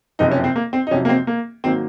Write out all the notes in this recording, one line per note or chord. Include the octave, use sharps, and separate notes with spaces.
F#1 F2 C3 F3 D#4
C#4
C4
A#3
C4
D#4
F2 C3 F#3 C#4
A#3
C4
A#3
G#1 F#3 A#3 C4